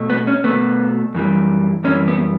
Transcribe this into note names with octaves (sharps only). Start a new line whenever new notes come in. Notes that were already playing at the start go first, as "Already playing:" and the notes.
Already playing: B2 A3
B3
C#4
B2 A3 B3
F#2 E3 G3
F#2 E3 G3 C#4
B3